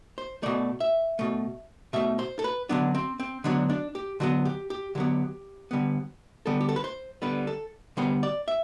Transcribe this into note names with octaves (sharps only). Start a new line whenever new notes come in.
C5
B2 A3 D5
E5
B2 A3
B2 A3 E5
C5
A4
B4
D3 F#3 B3 D4
C4
C4
D3 F#3 B3 D4
D4
G4
D3 F#3 B3 F#4
G4
G4
D3 F#3 B3 G4
D3 G3 B3
D3 G3 B3 A4
G4
A4
B4
C5
D3 G3 B3 B4
A4
D3 G3 B3 C5
D5
E5